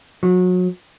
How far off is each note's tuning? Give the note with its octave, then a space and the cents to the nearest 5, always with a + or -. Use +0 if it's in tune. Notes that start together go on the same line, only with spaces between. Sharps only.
F#3 -30